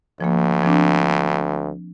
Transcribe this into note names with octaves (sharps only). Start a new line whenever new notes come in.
D2 F3 A#3
F3 C4 D4